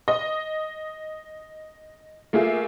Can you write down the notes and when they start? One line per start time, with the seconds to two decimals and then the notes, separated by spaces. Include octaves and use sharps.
0.08 D#5
2.33 A3 A#3 F4 G#4 E5